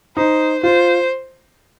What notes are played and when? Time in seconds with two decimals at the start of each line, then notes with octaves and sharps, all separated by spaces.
0.17 D#4 C5
0.63 F4 C5